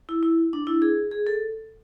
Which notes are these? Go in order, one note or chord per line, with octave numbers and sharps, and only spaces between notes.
E4
E4
D4
E4
G#4
G#4
A4